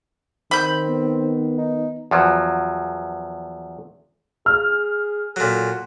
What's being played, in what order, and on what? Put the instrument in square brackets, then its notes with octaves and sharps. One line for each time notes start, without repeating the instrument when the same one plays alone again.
[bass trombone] D#3 [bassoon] C4 [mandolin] B5 G6
[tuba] B3
[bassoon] D#4
[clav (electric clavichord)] E2 F3 F#3
[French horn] G#4 [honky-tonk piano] F6
[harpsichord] A#2 F#3 [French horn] A4